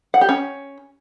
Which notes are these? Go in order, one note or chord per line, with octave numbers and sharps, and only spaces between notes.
F#5
G4
C#4